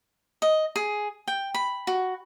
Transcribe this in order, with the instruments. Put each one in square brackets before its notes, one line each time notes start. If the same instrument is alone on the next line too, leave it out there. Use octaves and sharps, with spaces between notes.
[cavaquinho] D#5
G#4
G5
B5
F#4